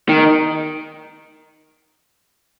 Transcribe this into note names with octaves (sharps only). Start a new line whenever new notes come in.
D#3